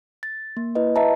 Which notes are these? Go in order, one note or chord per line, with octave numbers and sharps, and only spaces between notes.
A6
A#3
E4 B4 D#5
B4 D#5 E5 A5 A#5